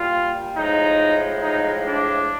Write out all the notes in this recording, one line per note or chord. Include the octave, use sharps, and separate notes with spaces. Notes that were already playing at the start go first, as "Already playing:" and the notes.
Already playing: A#2 G3 F4
A2 F3 G#3 D#4
D#4
D4